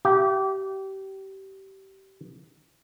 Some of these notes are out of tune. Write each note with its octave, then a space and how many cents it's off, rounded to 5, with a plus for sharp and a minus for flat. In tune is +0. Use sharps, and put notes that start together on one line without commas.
G4 -25 E5 +45